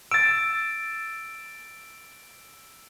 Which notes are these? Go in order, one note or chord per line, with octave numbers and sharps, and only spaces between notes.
E6 A6 D7